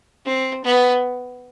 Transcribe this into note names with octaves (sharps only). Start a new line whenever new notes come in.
C4
B3